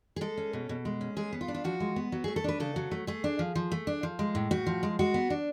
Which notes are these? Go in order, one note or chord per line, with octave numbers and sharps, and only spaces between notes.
G#4
G#3 A4
C#4
B2
B2
G#3
C#4
G#3 G#4
B3
F4
D4
F4
F3 F#4
G#3
B3
F#3
G#4
A3
A4
D4 B4
C#3 A4
F#3
A3
A3 G#4
D4
F3
F3
A3
D4
F3
G#3
A2
A2 F#4
F3
G#3
G#3 F#4
B3
D4